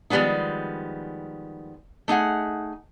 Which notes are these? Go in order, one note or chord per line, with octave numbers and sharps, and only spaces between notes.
D#3 F3 G3 G#3 B3 D#4
A3 D#4 G#4 F#5